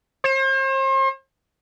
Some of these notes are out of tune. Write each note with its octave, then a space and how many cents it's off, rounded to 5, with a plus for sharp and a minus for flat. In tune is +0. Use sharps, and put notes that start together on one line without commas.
C5 +40